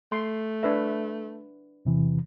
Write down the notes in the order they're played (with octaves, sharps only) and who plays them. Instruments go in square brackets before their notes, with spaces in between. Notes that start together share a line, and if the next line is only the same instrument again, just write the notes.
[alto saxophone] A3 [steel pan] C6
[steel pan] D4 B4 E5
[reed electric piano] E2 C3 E3